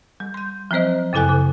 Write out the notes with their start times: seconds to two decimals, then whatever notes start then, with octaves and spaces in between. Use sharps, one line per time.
0.20 G3
0.34 C6 G6
0.71 F3 F#3 C4 C5 D#5
1.13 F#2 C#3 E4 A4 G#5 F#6
1.29 C#3